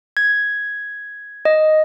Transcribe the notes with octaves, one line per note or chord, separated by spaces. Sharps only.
G#6
D#5